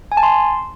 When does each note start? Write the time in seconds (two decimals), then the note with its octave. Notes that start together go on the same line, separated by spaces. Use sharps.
0.12 G#5
0.17 A5
0.23 C6